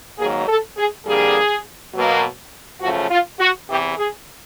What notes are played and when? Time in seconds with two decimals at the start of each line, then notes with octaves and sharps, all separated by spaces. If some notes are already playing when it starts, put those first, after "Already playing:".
0.19 G#2 D#3 F#3 A#3 G#4
0.48 A4
0.77 G#4
1.06 F2 D3 G3 A#3 G#4
1.94 B2 F#3 A#3
2.81 F#2 C#3 F3 A3 F#4
3.10 F4
3.40 F#4
3.69 E2 C3 E3 G4
3.98 G#4